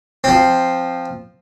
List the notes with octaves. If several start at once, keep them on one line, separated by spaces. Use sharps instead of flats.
F3 C4